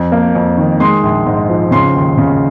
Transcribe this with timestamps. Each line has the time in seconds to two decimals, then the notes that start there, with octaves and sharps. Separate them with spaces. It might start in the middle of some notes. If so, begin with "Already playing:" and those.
Already playing: F2
0.12 A#3
0.35 F2
0.58 D#3
0.80 G#3 C6
1.03 A#1
1.26 G#2
1.49 F3
1.71 C#3 C6
1.95 D#2
2.18 C#3